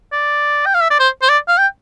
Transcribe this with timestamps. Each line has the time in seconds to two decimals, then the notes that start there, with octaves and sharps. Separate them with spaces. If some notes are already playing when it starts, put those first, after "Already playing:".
0.12 D5
0.66 G5
0.74 F5
0.81 E5
0.90 D5
0.99 C5
1.22 C5
1.29 D5
1.48 F5
1.58 G5